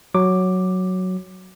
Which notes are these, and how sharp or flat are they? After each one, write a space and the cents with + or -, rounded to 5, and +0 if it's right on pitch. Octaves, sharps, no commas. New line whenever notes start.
F#3 +0 D6 +10